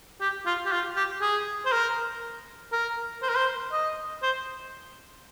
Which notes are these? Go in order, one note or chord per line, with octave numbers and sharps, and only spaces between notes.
G4
F4
G4
F4
G4
G#4
C5
A#4
A#4
C5
A#4
C5
D#5
C5